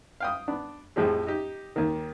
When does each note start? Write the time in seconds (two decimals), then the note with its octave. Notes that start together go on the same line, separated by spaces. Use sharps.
0.20 F5 G5 D#6
0.48 B3 D4
0.96 F2 A2 F3 G#3 G4 G#4
1.27 D#4 G4
1.76 D#2 D#3